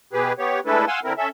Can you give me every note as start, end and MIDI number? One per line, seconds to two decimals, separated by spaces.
0.13 0.33 47
0.13 0.33 67
0.13 0.33 68
0.13 0.33 71
0.39 0.60 59
0.39 0.60 67
0.39 0.60 73
0.66 0.85 56
0.66 0.85 57
0.66 0.85 62
0.66 0.85 64
0.66 0.85 69
0.66 0.85 71
0.87 1.00 77
0.87 1.00 78
0.87 1.00 80
0.87 1.00 84
0.87 1.00 88
1.04 1.13 50
1.04 1.13 60
1.04 1.13 64
1.04 1.13 70
1.18 1.29 61
1.18 1.29 69
1.18 1.29 76